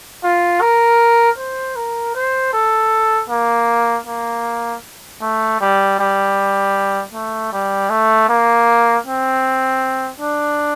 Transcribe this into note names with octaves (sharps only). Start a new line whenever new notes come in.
F4
A#4
C5
A#4
C5
A4
A#3
A#3
A3
G3
G3
A3
G3
A3
A#3
C4
D4